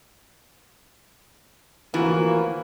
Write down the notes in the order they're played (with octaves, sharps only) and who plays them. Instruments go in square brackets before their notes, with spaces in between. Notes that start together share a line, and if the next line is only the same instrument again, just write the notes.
[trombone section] G#1 F3 A#3 [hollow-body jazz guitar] D2 F4 F#4 [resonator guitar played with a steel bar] E3